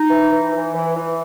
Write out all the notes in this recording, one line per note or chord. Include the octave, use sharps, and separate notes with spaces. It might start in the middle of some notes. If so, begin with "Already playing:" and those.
Already playing: D#4
E3
E3
E3
E3
E3